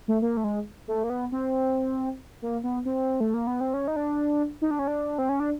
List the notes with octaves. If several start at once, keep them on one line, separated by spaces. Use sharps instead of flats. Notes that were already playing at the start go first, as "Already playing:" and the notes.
A3
A#3
A3
G#3
A3
A#3
B3
C4
A#3
B3
C4
A3
A#3
B3
C4
C#4
D#4
D4
D#4
D4
C#4
D4
C4
C#4
D4